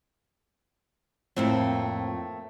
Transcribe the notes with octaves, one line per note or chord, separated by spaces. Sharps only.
F2 A2 A3 A#3 C4